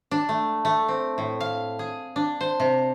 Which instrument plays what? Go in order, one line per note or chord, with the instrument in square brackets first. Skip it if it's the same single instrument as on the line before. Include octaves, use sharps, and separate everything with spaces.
[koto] D4
A3
A3
C4
A2
F5
G#4
D4
C5
C3